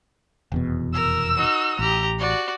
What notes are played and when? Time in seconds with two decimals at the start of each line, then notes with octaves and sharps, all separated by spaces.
0.52 F1 E2 B2
0.94 A#4 E6
1.37 D#4 F#4
1.79 A1 G4 A#5
2.19 F#4 D5